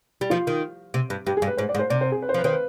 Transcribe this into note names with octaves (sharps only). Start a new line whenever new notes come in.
G3
F3 F4
D#3
C3
G2
G2 G4
G#4
G2
B4
G#2 C5
D5
G#2
C5
C3 D5
C5
G#4
B4
C5
F3 B4
D#3 C5
B4